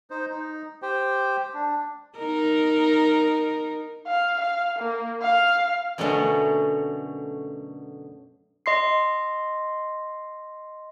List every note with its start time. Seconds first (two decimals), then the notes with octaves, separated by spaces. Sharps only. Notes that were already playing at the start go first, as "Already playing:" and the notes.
0.10 D#4 C5
0.30 D#4
0.82 G4 C5 G5
1.54 D4
2.18 D#4 A#4
4.07 F5
4.40 F5
4.78 A#3
5.22 F5
5.98 F#2 B2 D3 F#3 A3 C#4
8.66 D#5 C6 C7